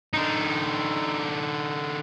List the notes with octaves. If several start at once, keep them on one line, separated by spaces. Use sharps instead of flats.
D3 D#4